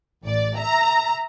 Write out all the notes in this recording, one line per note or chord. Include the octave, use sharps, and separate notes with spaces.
A1 D5
E5 A#5